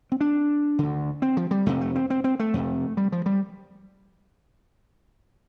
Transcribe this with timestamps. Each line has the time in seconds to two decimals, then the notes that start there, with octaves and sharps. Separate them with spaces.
0.12 C4
0.21 D4
0.79 D2 D3
1.22 C4
1.37 F3
1.51 G3
1.66 F2 C3 A3
1.81 A3
1.96 C4
2.10 C4
2.24 C4
2.39 A3
2.54 F2 C3
2.97 G3
3.12 F3
3.26 G3